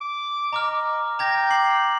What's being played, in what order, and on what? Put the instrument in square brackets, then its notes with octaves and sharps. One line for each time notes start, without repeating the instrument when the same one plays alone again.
[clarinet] D6
[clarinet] D#5 [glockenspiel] A#5 D6 F6
[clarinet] G5 [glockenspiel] A#5 G#6 A#6
[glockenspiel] D6 C7 F#7